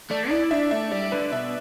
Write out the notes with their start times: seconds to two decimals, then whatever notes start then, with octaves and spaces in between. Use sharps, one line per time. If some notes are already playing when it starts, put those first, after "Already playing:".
0.11 A3 D5
0.31 E4 D5
0.51 D4 E5
0.71 A3 E5
0.91 G3 D5
1.12 D3 B4
1.32 B2 E5